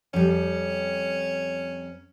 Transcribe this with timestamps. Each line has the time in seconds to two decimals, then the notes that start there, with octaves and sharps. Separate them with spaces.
0.14 F2 G3 C#4